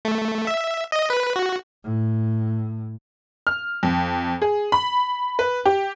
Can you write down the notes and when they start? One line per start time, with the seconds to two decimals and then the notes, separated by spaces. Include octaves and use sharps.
0.05 A3
0.47 E5
0.92 D#5
1.10 B4
1.36 F#4
1.84 A2
3.47 F6
3.83 F2
4.42 G#4
4.72 B5
5.39 B4
5.66 G4